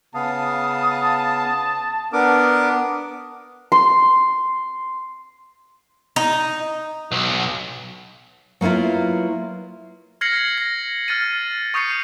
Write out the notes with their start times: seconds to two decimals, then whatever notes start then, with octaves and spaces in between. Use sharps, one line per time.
0.15 C#3 B3 F5 A5 D#6
2.13 B3 D4 A#4 D6 D#6
3.72 C6
6.16 D#4
7.12 B1
8.61 F#3 A#3 B3 E4 F4
10.21 F6 G#6 A#6 C7 C#7 F#7
10.58 A#6
11.08 F6 A6 D#7
11.74 C#6 D#6 G6 C7 C#7 D#7